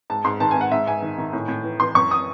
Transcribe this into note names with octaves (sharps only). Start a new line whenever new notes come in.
G#2 A5
G#2 C6
D#3 A5
G#5
G#2
F#5
G#2 E5
G#2 G#5
D#3
D#3
A2
A2
E3
E3 C6
F#2 C#6
D#6